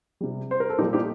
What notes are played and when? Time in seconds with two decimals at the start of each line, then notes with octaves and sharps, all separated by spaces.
0.21 C3 G3
0.51 C5
0.60 A#4
0.70 A4
0.78 A#2 D#4 G4
0.82 G3
0.93 D#4 G4